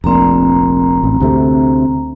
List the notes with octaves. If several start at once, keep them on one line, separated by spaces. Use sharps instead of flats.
F1 A#1 A#2 C4 A#5
A1
D2 C3 A3